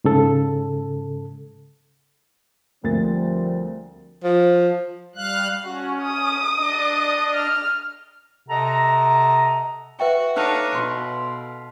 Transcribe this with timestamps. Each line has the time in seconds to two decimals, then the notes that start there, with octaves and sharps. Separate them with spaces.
0.04 G#2 C#3 A4
2.84 D2 F3 G3 C4 A#4 A6
4.24 F3
5.16 G3 F5 F#6
5.64 C#4 F#4
6.03 D#6
6.56 D4 D#5
7.34 F6
8.49 C3 A4 D#5 F#5 A#5
10.00 F#4 B4 E5 G5
10.36 D4 D#4 A4 C#5 F5 F#5
10.75 B2 C6